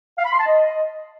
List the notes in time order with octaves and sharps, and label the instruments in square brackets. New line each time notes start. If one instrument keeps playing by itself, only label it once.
[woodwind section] F5
B5
C6
A5
D#5